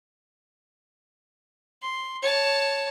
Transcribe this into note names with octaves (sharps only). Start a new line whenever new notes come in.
C6
C#5 A5